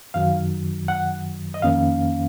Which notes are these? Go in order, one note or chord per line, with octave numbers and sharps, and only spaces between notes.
F#2 D#3 F#3 F5
F#5
D#5
F2 D#3 A#3 C#4 F5